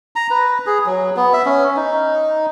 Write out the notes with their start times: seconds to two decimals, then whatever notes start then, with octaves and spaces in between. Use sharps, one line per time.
0.16 A#5
0.30 B4
0.66 G#4
0.86 F#3
1.16 B3
1.33 E5
1.46 C#4
1.76 D#4